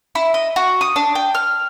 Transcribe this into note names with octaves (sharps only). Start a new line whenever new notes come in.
E4
D#5
F#4
D#6
D4
G5
F6